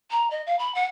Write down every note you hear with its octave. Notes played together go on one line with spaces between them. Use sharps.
A#5
D#5
F5
B5
F#5